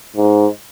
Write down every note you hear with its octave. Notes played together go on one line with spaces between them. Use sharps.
G#2